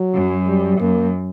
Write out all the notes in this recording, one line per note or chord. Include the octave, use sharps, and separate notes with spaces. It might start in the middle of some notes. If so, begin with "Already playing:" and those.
Already playing: F#3
F#2
G3
F#2 A#3